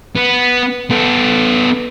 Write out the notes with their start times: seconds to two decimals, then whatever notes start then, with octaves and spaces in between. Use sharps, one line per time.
0.15 B3
0.90 B3 A4